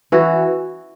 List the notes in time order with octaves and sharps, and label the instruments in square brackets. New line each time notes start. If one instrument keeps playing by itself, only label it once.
[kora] E3 F#4